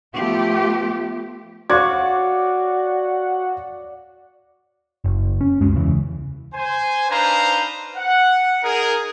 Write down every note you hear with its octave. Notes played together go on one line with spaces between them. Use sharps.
F3 A3 B3 F4 G4
F#4 D5 F5 C#6 G#6
F#1
C#4
C#2 F#2 G#3
E2 C#3 E3
C5 G#5
D4 D#4 B4 C5 F5 A#5
F#5
D#4 G#4 A#4